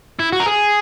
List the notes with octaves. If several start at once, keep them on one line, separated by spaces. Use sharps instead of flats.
E4
F#4
A#4
G#4